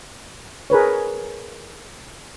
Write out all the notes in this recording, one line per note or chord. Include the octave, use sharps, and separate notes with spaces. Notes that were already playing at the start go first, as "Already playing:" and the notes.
G#4 A#4 B4 C#5